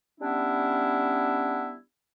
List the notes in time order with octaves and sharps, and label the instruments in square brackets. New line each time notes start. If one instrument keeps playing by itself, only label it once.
[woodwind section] G3 B3 C#4 D4 E4